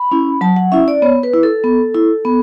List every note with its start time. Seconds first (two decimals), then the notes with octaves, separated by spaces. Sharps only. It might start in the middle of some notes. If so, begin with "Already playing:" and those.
Already playing: B5
0.11 C#4 E4
0.41 F#3 A5
0.56 F#5
0.72 C#4 E4 E5
0.88 D5
1.02 B3 C#5
1.23 B4
1.33 E4
1.43 A4
1.64 B3
1.94 E4
2.25 B3